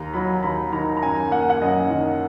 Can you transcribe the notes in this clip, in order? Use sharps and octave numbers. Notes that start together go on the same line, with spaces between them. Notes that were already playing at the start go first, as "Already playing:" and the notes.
Already playing: D#2 A#5
F#3 B5
D#2 B5
D#3 A#5
A#5
F#2 G#5
A#3 F#5
G#5
F#5
F#2 D#5
D#3